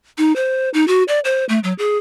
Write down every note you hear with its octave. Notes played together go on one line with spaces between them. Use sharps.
D#4
C5
D#4
F#4
D5
C5
A3
F#3
G#4